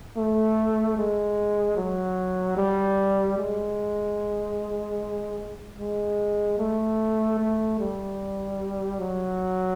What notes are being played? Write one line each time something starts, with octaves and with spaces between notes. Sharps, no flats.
A3
G#3
F#3
G3
G#3
G#3
A3
A3
G3
F#3